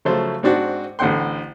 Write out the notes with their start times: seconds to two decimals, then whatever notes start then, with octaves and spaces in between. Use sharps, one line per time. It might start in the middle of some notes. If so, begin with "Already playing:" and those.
0.05 C#3 F3 F#3 A3 C5
0.43 G#2 C4 D4 F#4
0.99 A1 D3 C4 F#5 G5 C6